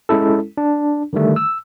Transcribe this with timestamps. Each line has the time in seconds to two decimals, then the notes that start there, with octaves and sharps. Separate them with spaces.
0.09 G#3 C#4 E4 A4
0.57 D4
1.13 D3 D#3 G3 A3
1.36 E6